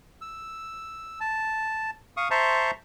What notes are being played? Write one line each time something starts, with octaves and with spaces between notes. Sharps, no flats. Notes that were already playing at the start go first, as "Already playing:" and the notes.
E6
A5
F5 C#6 D#6
C5 E5 A5 A#5 C6 C#6